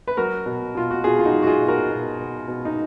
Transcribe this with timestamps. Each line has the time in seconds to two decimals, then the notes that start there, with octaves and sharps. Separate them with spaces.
0.08 B4
0.17 F#3 F#4 A#4
0.46 B2
0.75 B2 F4
0.91 F#4
1.04 B2 F4 G#4
1.19 F4
1.25 D#4 F#4
1.32 F#3
1.42 F#4
1.47 F4 G#4
1.62 B2
1.68 F#4 A#4
1.90 B2
2.20 B2
2.48 B2
2.65 D#4